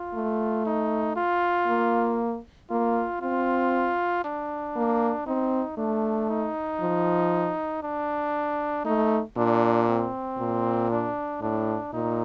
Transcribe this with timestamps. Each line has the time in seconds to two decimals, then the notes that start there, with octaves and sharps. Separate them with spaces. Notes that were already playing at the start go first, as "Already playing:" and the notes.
Already playing: F4
0.15 A3
0.66 D#4
1.17 F4
1.67 A#3
2.70 A#3 F4
3.22 C4 F4
4.24 D4
4.76 A#3
5.27 C4 D#4
5.78 A3 D4
6.30 D#4
6.80 F3
7.83 D4
8.85 A3 D#4
9.37 A#2 D4
9.88 C4
10.39 A#2
10.91 D4
11.41 A2 D4
11.93 A#2 D#4